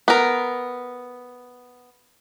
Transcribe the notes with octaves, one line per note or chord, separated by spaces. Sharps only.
B3 A#4